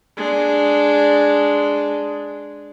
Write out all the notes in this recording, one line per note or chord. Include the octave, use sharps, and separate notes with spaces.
G#3 D4